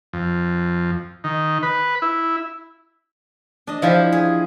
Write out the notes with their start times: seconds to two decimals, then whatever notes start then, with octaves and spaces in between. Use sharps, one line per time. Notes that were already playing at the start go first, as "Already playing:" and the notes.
0.13 F2
1.24 D#3
1.63 B4
2.02 E4
3.67 D4 D#5
3.82 F3 E4 F4 G4
4.12 G#4